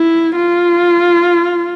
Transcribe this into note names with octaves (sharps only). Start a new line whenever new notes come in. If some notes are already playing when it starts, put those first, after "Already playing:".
Already playing: E4
F4